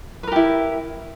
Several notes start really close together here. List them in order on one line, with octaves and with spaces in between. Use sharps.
B4 A#4 G4 E4